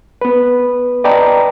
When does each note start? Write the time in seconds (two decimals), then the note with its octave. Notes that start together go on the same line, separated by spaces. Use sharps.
0.21 B3 B4
1.04 B4 D5 D#5 G5 A5 A#5